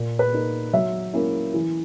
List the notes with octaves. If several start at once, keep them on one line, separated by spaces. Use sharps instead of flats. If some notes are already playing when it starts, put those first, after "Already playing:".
Already playing: A#2
B4
A#3 D#4
F#3 E5
A#3 C#4 E4
E3